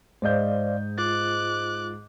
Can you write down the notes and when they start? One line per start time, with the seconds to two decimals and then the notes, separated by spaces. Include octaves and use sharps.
0.22 G#2 C5 D5 D#5 F5 G6
0.98 F4 D6 F#6 A6